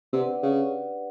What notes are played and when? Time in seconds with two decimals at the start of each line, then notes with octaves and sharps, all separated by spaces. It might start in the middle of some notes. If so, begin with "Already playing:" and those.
0.13 C3 D4 G4 B4 D5 F#5
0.43 C#3